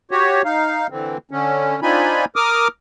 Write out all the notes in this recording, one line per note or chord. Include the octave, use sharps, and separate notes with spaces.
F#4 G4 C#5
D#4 F5
D3 E3 C4
D3 C#4
C4 D4 D#4 F4 G#5 B5
A#4 D6 D#6 F6